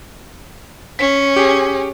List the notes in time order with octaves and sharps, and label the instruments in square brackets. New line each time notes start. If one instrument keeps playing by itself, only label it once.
[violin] C#4 [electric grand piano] B6
[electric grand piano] G4 G#4